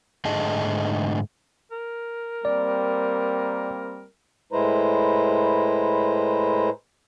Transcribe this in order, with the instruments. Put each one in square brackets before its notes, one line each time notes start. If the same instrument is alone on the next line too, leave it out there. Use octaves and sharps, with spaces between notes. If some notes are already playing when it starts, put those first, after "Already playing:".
[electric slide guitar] G#2 D3 A3 G#4 D#5 A5
[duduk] A#4
[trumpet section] G3 A#3 C4 [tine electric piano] D5
[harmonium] A2 G#3 E4 B4 C5 A#5